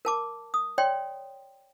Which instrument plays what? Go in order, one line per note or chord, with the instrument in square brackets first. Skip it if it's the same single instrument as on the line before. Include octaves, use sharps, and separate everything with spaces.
[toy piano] A#4 A5 D6
D#6
C#5 D5 G5 C6